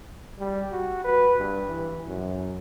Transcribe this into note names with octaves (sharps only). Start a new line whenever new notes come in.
G3
F#4
B4
G2
E3
F#2